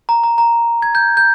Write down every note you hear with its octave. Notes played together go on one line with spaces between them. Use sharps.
A#5
A#5
A#5
G#6
G6
G6